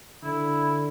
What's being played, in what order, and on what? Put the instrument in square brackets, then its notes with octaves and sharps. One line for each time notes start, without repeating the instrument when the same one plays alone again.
[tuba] D3 [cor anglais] E4